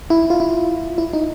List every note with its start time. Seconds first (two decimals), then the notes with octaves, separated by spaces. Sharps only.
0.10 E4
0.30 F4
0.40 E4
0.98 E4
1.13 D#4